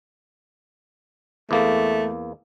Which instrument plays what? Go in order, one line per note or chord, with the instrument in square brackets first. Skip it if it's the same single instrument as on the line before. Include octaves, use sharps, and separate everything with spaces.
[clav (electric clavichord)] E2 A#3 [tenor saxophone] A3